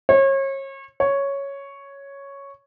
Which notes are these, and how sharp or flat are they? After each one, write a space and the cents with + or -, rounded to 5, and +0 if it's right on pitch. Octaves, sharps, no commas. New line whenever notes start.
C#5 -35
C#5 +0